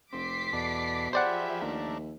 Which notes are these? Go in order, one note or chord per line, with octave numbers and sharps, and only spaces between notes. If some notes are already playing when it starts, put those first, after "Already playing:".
F1 C4 D6 B6 C7
E2 B2 A4 D5
F3 G4 G#4 C5 D5 E5 F#5 B5
D#2 A3 D4 A#4